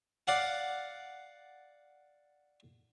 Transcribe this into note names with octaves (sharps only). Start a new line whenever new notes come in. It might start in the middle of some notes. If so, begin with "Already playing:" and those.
D5 F5 F#5